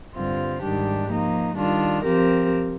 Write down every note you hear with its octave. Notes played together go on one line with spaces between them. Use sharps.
G2 D3 G3 C4 F4
G#2 D#3 G3 D4 G4
F3 A#3 D#4
D#3 G3 D4 F4
F3 C4 G4 A#4